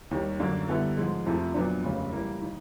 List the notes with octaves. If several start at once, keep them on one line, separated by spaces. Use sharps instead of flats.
D#2 D#3 G3
F#2 D3 F#3 A#3 D4
D3 G3 B3 E4 A4
G#2 F3 G#3
F2 C3 F3 A3
A#2 F#3 B3 D4
F1 D#2 C#3
E3 G3 A#3
D#3